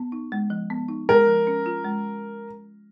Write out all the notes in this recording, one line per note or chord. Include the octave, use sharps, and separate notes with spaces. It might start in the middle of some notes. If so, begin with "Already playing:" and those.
Already playing: B3
D#4
G#3
F3
B3
D#4
G#3 A#4
F3
C#4
F4
G#3